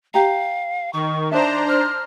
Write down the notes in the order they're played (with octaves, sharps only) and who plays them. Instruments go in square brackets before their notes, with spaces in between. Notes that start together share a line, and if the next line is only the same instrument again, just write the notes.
[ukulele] G4 A#5 [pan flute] F5
[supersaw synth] D#3 [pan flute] C#6
[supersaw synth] D4 C5 A#5 [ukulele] D#4 D5 E5 [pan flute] A5
[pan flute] F6